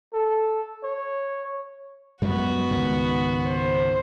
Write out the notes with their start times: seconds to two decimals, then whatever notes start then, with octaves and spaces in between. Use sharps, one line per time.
0.13 A4
0.83 C#5
2.22 F#2 G3 G#3 B3 F#4
2.71 C#2 G#2 D#3
3.46 C5